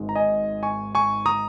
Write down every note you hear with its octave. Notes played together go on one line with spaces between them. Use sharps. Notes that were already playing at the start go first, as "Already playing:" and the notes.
Already playing: G#1 G#2 G#3
A#5
D#5 G#5
G#5 C#6
G#5 C#6
A#5 D#6